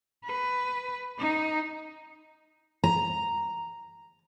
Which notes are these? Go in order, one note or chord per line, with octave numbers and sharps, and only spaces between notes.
B4
D#4
A#5